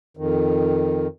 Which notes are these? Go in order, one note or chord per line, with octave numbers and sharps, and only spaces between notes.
F2 D#3